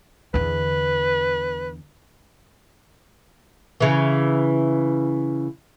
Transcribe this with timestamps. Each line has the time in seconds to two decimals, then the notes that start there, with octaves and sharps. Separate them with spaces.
0.34 E2 D3 B4
3.80 C#3 E3